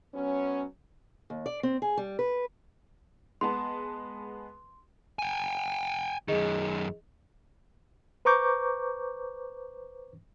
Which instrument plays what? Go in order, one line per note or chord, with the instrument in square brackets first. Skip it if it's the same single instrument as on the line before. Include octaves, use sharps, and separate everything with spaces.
[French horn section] F#3 B3 C#4
[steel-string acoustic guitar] D#2
D5
C4
G#4
G3
B4
[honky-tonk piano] G#3 B3 A5 [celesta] C6
[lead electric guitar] G5 G#5
[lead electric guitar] F#2 D#3 [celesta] G#4 D#5
[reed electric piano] B4 C5 A#5 C#6 D6 G6